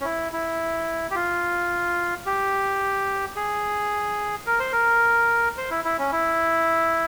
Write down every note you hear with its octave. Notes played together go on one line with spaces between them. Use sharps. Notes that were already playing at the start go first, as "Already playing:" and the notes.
C#4
E4
E4
G4
F4
G4
G#4
A#4
C5
A#4
C5
E4
E4
C#4
E4